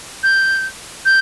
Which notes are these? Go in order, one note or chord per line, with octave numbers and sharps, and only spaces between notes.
G6
G6